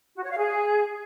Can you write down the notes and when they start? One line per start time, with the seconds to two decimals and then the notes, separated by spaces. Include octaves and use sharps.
0.16 F#4
0.23 C#5
0.31 F5
0.38 G#4